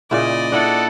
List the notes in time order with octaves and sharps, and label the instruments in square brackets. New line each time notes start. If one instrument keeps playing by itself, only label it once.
[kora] A#2 C#3 E4 [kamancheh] D5 D#5
[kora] D4 E4 [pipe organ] A4 F#5